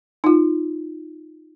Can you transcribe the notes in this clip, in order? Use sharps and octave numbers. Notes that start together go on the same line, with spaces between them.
D#4 F4